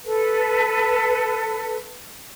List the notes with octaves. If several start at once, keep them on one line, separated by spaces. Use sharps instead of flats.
A4 B4